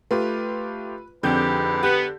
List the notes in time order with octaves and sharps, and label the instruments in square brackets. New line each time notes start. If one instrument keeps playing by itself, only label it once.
[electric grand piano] A3 F4 G4 [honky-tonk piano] B4
[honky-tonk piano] F2 G6 [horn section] G#2 G3 G4 [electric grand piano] D3 [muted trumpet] B4
[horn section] B3 [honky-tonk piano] G4